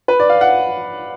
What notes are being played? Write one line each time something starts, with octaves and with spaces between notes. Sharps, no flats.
B4
D5
F5
F#5